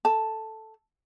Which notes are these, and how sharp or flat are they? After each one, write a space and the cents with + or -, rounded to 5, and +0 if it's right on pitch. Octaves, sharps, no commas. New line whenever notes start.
A4 +0 A5 +0